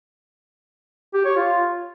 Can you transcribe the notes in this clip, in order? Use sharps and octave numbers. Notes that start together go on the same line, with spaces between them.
G4
C#5
F4